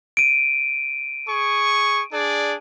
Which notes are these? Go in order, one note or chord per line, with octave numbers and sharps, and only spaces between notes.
D7 D#7
G#4 C#6
D4 G#4 D5